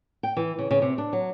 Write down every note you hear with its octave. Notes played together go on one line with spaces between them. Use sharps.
G5
E3
C#3
C#3
C3
D4
F#3